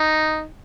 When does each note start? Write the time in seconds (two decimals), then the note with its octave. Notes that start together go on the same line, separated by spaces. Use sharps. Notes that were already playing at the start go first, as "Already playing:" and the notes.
Already playing: D#4